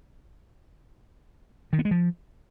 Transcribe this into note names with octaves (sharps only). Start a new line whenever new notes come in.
D#3
B3
G#3
F3